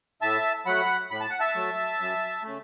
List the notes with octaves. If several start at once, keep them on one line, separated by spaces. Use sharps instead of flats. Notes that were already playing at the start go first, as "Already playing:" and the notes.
A2 E5 A5
F#3 A3 F#5 B5
A2 B5
A5
F#5
E5 A5
F#3 A3
F#2
C#3 A3